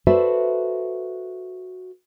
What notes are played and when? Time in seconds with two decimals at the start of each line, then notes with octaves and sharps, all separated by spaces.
0.07 F#4 A4 B4 C5 D5 E5